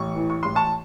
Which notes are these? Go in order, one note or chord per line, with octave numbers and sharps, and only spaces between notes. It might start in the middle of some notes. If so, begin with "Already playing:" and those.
Already playing: A1 C#6
E3
C#6
A1 C6
A5 C#6